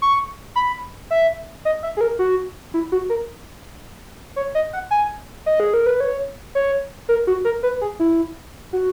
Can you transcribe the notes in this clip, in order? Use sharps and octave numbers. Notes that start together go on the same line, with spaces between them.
C#6
B5
E5
D#5
E5
G#4
A#4
F#4
E4
F#4
A#4
C#5
D#5
F#5
G#5
D#5
G#4
A#4
B4
C#5
C#5
A#4
F#4
A#4
B4
G#4
E4
F#4